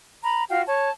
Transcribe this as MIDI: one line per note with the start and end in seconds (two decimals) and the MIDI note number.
0.23 0.44 82
0.23 0.44 83
0.50 0.62 65
0.50 0.62 66
0.50 0.62 77
0.50 0.62 79
0.66 0.90 73
0.66 0.90 81